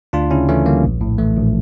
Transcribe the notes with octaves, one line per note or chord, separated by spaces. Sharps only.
D2 D4 F4
C#3 C#4 E4
E3 A3 C#4
D2 G3 A#3
A#1
A2
E3 A3
A#1